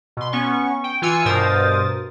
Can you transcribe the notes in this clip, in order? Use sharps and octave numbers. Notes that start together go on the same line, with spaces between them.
B2 C6
B3 C#4 C#6
G5
E3 F4 G#5 E6 C#7
G2 B2 A#4 C5 D#6 A6